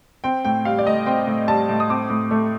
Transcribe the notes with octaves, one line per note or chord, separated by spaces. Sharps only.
C4 G5
A2 G5
G3 F5
D5
A2 D#5
C4 G5
A2
G3 A5
A2
D#6
C4 D6
A2
A3